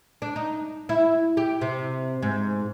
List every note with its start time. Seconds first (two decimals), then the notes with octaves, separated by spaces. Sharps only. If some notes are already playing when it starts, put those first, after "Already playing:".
0.22 D4
0.36 D#4
0.89 E4
1.37 G4
1.61 C3
2.22 G#2